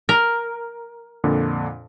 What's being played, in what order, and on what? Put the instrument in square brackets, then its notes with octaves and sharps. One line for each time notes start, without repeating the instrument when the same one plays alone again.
[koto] A#4
[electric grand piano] F2 A#2 D3